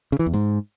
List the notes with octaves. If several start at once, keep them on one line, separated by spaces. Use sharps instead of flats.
C#3
E3
E2
G#2